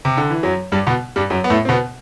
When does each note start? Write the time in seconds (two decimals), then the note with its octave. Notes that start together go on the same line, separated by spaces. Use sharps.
0.05 C3
0.17 D3
0.30 E3
0.43 F#2 F#3
0.72 G2 G3
0.87 B2 B3
1.16 G2 G3
1.30 F#2 F#3
1.44 B3
1.50 A2 A3
1.65 C4
1.69 B2 B3